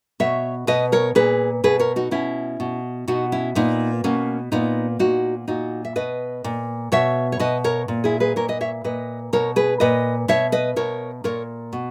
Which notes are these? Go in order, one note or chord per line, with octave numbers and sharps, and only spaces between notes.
B2 C#5 E5
B2 B4 D#5
A#4 C#5
A#2 G#4 B4
B2 G#4 B4
A#4 C#5
D#4 F#4
B2 C#4 E4
B2
B2 D#4 F#4
C#4 E4
A#2 B3 D#4
B2 A#3 C#4
A#2 B3 D#4
A#2 D#4 F#4
A#2 D#4 F#4
E5
B2 B4 D#5
A#2
B2 C#5 E5
C#5
B2 B4 D#5
A#4 C#5
A#2
E4 G#4
G#4 B4
A#2 A#4 C#5
B4 D#5
C#5 E5
A#2 B4 D#5
B2 A#4 C#5
G#4 B4
A#2 B4 D#5
B2 C#5 E5
B4 D#5
B2 A#4 C#5
A#2 A#4 C#5
B2